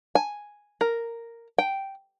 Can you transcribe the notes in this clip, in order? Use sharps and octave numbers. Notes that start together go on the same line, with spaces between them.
G#5
A#4
G5